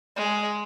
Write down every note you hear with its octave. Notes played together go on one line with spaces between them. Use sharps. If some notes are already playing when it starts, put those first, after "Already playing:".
G#3